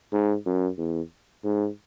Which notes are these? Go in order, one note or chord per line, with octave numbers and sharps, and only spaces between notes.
G#2
F#2
E2
G#2